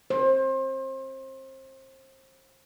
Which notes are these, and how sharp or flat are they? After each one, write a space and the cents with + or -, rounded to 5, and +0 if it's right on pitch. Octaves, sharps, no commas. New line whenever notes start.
C5 +30